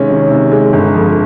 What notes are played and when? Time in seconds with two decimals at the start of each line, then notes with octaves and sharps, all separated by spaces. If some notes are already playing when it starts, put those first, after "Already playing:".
Already playing: C3 D#3 G#3 C#4
0.10 D#3
0.30 C3
0.52 G#3
0.73 G1
0.94 F2